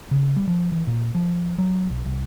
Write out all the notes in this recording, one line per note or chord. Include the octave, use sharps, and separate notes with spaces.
C#3
G3
F3
E3
A#2
F3
F#3
B1
C2